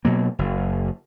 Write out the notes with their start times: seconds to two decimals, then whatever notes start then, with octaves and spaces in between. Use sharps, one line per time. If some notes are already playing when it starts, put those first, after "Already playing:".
0.05 B2 F#3 A#3
0.39 F#1